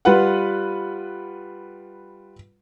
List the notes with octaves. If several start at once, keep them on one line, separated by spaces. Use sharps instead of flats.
G3 F4 B4 F#5